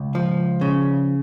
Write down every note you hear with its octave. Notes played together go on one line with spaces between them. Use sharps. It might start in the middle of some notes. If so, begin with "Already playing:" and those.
Already playing: C#2
F3
C#3